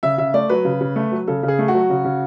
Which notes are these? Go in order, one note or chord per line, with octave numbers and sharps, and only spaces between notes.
C#3 E5
C#3 E5
A3 D5
F#3 B4
C#3
C#3
A3
F#3
C#3 A4
C#3
G#4
A3
F#4
F#3
C#3
C#3